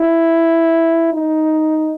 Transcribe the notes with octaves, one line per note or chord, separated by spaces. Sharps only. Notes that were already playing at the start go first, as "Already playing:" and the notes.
Already playing: E4
D#4